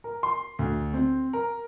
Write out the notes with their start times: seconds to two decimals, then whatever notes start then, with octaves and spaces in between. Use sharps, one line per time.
0.04 A#4
0.23 C6
0.59 D2
0.94 C4
1.33 A#4